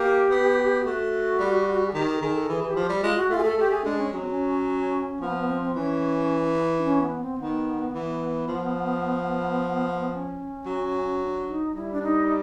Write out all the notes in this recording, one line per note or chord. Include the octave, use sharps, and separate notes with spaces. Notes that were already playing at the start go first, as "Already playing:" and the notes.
Already playing: A#3 G4
B3
A3 F#4
G3
G#4
D#3 G4
G4
A4
D#3 G#4
A4
E3 G#4
E3 G4
F3
G3
G#3 F4
F#4
A3 F4
G#4
A3 A4
A3 G4
G#4
G#3 D4
C#4
F#3 C#4
C4
C#4
F3 B3
B3
C4
C4
E3 C#4
D4
C#4
B3
C4
D#3 B3
E3 B3
F3
C#4
F#3
D4
D#4
G3 E4
D4
D#4